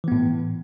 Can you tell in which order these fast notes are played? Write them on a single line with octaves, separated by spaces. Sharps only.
E3 B3 A2